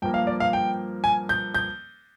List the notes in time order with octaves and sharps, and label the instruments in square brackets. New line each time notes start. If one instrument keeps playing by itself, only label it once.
[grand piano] G2 F3 A#3 G5
F5
D5
F5
G5
G#5
G6
G6